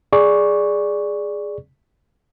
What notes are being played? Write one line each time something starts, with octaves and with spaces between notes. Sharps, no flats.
G#4 D5 C#6